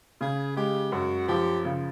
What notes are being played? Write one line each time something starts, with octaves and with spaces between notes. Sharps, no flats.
C#3 G#4
G#3 G4
F#2 F#4
F3 G4
C#3